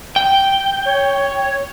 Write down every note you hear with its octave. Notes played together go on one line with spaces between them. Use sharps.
G5
C#5